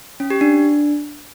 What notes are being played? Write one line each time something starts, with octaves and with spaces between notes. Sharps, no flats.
C#4
G4
D4